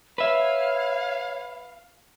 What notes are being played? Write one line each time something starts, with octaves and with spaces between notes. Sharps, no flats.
B4 C#5 E5 F5